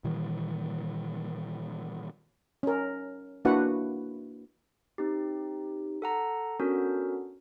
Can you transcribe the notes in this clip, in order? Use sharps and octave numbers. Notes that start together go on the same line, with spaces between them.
A#2 D#3 E3 G3
C#4 A#4
A#3 D4 E4 F#4 B4 F#5
C4 D#4 G4
A4 F#5 A#5
B3 C#4 D4 F#4 A4 A#4